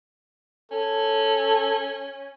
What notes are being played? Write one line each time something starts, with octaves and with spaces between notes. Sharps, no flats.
C#4 A4